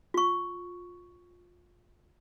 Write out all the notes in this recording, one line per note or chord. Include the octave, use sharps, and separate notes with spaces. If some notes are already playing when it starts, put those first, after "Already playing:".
F4 C#6